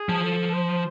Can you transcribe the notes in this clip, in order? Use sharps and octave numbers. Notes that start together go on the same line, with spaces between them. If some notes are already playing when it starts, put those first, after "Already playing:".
Already playing: G#4
F3
A4
C5